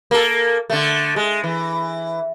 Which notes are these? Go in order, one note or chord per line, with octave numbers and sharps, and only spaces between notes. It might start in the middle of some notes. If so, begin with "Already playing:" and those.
A#3 A4
D3 A3
G#3
E3